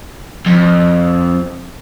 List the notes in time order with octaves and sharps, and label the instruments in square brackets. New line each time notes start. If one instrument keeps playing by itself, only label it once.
[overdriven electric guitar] F2